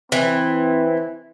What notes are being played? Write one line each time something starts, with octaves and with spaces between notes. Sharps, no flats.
E3 C4